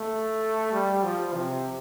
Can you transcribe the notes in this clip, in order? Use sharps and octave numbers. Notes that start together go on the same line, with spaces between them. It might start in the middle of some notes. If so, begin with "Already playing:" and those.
Already playing: A3
G3
F3
C3